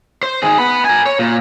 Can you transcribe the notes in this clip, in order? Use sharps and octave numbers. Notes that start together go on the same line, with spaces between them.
C5
D#3 G#4
B3 B5
A#4 G#5
C#5
A#2